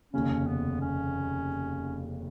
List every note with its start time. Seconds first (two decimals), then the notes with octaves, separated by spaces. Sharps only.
0.14 F1 D#2 C#3 C#4
0.47 B3
0.81 C#4